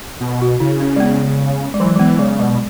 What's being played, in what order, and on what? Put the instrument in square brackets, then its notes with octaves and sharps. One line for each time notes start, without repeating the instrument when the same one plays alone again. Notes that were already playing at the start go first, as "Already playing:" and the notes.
[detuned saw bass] B2
[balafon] F#4
[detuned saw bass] C#3 [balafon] E4
[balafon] C#4
G#3
B3
G#3
[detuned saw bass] E3 [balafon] F#3
[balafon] G#3
[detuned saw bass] E3 [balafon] B3
[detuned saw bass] C#3 [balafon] G#3
[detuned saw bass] B2 [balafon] G#3